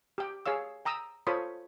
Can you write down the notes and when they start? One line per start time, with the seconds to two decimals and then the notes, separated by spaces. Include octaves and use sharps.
0.18 G4 G5
0.46 G#4 C#5 F5 E6
0.85 G5 A#5 D#6 E6
1.27 F4 A4 C5 C#5 B5 D#6